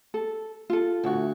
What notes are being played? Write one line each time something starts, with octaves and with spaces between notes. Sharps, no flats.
A4
F4 A4
D2 F#4